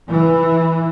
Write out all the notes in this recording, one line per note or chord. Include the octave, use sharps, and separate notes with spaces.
E3